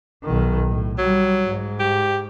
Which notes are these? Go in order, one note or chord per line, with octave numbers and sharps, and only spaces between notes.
B1 D#3
A2
F#3 G3
G#2
G4